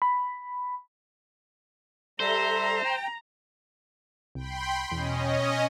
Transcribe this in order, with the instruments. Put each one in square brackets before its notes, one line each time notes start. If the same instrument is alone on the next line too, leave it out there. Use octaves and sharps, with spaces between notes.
[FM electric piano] B5
[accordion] G3 A4 E5 [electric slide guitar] C5 [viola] A#5
[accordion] G5
[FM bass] C2 [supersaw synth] G5 B5 C6
[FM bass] E2 [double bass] B2 [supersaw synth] C#4 D#5